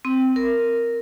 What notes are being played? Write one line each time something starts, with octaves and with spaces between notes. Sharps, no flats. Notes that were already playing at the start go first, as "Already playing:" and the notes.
C4
A#4